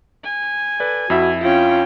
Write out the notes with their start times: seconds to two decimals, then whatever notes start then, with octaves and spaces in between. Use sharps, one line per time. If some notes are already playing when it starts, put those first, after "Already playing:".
0.24 G#5
0.80 A4 B4 D5
1.10 F2 E4 F#4 E5
1.43 C#4 F4 G5